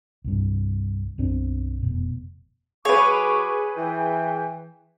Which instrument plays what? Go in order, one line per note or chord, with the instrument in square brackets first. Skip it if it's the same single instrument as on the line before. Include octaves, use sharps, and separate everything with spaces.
[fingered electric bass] C2 G2
B1 F#2 C4 D4
F1 B2
[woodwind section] F#3 C#6 D6 [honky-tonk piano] G#4 B4 [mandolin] C#5
[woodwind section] E3 G5